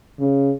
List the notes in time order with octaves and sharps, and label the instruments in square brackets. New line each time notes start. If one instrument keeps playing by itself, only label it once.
[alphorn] C#3